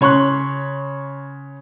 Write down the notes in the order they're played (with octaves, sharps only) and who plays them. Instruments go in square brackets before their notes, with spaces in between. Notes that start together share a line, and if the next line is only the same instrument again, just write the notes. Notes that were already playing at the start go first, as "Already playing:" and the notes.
[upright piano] C#3 C#5 B5 C6 F#6